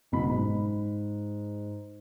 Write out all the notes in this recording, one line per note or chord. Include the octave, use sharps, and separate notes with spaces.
F#1 B2 B5
G#2